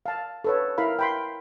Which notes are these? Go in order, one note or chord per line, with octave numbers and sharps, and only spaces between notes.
F5 A5
A4 B4 C#5
E4 A#4 F5 B5
G5 B5 C6